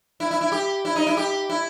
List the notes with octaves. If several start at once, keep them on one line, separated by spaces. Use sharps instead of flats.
E4
E4
E4
G4
E4
D#4
E4
G4
E4